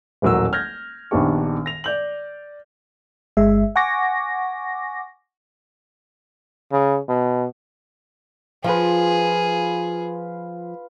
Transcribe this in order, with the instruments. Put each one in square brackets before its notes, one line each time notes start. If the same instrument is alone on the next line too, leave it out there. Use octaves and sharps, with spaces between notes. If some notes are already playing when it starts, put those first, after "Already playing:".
[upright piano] D#1 A1 F#3 A#4 E6
F6 G6 G#6 A#6
A#1 D#3 B3 D4 G4 C#6
A#6 F7
D5 G6 F#7
[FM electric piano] G1 G#3 E5
F#5 G#5 C#6 D6 A#6
[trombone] C#3
B2
[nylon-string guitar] F3 [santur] F4 B4 [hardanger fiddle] G#4